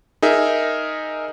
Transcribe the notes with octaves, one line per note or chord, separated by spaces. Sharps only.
D#4 G#4 A#4 E5